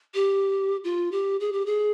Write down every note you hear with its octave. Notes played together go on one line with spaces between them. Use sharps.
G4
F4
G4
G#4
G4
G#4